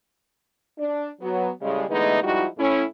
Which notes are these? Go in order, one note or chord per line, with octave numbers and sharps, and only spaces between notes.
D4
F#3 B3
A2 C#3 G3 G#3
D3 E3 G#3 A3 B3 D#4
F3 G3 G#3 D#4 E4 F#4
A2 C#4 E4